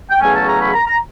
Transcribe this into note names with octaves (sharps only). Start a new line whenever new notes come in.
G5
E2 C#3 F#3 A3 C#4 G#5
A5
A#5
B5
A#5
A#5